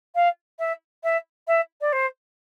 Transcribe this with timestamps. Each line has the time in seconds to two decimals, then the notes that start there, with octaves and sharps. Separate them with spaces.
0.15 F5
0.59 E5
1.03 E5
1.47 E5
1.81 D5
1.92 C5